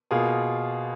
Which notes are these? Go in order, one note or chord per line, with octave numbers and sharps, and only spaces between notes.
B2 A#3 F4 G#4